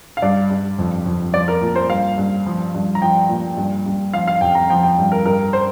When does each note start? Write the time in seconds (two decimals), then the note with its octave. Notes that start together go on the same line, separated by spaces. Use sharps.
0.17 F5
0.22 G2 D5
0.50 G2
0.78 F2
1.06 F2
1.33 F3 D5
1.48 A#4
1.61 A#2
1.76 C5
1.90 G2 F5
2.18 G2
2.46 F3
2.74 G2
2.95 A#5
3.01 F3 G5
3.29 A#2
3.57 G2
3.86 G2
4.14 F3 F5
4.28 F5
4.41 F2 G5
4.55 A#5
4.70 F3 G5
4.83 G5
4.98 G2
5.12 A#4
5.26 G2 A#4
5.53 C5